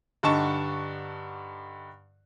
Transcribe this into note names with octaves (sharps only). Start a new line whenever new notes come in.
G2 D3 D#4 A5 C#6 E7